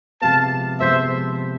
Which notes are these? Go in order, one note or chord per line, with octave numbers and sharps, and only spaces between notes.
C3 F3 G#3 B3 F5 A5
C3 F3 G#3 B3 C5 E5